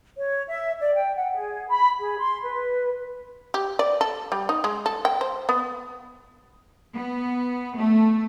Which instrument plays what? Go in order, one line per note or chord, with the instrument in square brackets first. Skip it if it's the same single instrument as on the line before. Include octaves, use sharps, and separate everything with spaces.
[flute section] C#5
E5
D5
G5
F#5
G#4
B5
G#4
C6
B4
[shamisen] G4
D5
A4
G3
D#4
G#3
A4
G5
C5
B3
[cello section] B3
A3